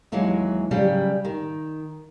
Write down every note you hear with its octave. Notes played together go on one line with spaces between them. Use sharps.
D#2 E3 F#3 G#3
C#3 F#3 G3
D#3